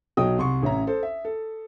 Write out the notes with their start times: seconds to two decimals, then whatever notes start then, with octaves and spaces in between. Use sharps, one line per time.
0.17 B1 F#3 C#5 D#5 G5 D#6
0.38 C2 C6 C#6
0.62 A1 C#4 E5 A#5
0.87 A4 C5
1.03 E5
1.25 A4